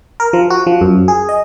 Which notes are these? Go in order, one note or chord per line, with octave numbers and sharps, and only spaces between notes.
A#4
F3
F#4
F3
F#2
G#4
D#5